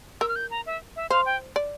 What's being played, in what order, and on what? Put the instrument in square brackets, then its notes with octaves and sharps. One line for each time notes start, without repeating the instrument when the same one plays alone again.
[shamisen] A#4 [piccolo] E6
[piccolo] F6
G6
A#5
E5
E5
[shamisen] C5 [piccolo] F5
[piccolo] G5
[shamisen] D5